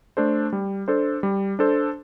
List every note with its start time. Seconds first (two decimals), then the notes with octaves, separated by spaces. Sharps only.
0.17 A3 D4 A4 C5
0.53 G3
0.88 D4 A4 C5
1.23 G3
1.59 D4 A4 C5